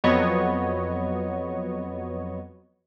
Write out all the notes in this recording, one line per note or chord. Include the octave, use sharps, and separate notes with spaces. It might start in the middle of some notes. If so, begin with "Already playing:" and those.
F2 F#3 B3 C#5 D#5 C#6